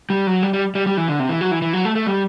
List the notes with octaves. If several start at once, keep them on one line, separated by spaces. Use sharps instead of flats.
G3
F#3
G3
G3
G3
G3
E3
D3
C3
E3
F#3
E3
E3
F#3
A3
A3
G3